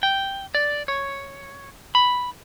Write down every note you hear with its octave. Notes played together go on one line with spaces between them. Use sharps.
G5
D5
C#5
B5